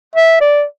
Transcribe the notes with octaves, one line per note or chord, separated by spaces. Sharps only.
E5
D5